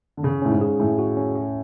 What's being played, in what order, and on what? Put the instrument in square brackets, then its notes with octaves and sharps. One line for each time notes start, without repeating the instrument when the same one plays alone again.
[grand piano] D3
[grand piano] C#3 [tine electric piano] C#4
[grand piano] A2 [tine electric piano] C#4
[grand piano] G#2
[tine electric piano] G#4
[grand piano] A2 [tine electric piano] C#4
[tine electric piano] F#4
C#4
C#4